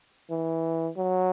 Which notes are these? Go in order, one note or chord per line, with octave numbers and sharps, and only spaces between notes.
E3
F#3